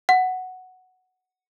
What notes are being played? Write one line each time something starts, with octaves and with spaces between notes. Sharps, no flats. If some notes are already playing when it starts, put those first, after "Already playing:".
F#5